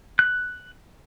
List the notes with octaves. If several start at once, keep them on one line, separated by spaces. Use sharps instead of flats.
F#6